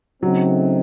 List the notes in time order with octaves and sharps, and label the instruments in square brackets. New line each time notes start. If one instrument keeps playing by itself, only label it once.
[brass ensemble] C#3 A3 C4 D#4 [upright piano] F#3